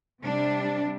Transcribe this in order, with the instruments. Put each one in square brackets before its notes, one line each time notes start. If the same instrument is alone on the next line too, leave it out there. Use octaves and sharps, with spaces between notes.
[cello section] C3 G3 D4